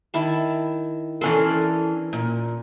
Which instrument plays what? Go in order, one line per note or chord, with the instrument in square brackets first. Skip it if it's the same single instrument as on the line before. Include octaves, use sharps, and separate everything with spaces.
[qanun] D#3 E4 A5
[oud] E3 D4 A4 [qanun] C#4 A#4 C6
[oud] A#2